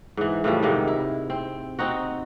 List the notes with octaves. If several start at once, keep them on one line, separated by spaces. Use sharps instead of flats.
G#2 E3
A2 C#3 F3 G3
G#2 C3 D#3
E4
C4
C4 D#4 F#4